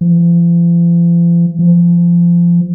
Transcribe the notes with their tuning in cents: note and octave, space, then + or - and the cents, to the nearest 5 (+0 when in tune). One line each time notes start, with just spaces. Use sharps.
F3 -40
F3 -20